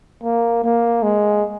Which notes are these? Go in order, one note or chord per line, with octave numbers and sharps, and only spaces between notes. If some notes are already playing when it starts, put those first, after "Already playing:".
A#3
A#3
G#3